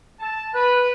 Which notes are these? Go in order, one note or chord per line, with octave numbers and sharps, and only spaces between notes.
A5
B4